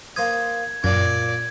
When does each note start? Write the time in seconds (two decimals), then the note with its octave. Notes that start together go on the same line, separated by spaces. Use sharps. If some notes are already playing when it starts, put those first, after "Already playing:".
0.16 A#3 C5 D#6 G#6
0.84 F#2 A#2 D5 G#6